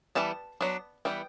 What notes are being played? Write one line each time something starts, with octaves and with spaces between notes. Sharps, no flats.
E3 G3 B3 A5
F#3 B3 D4
E3 G3 B3 G5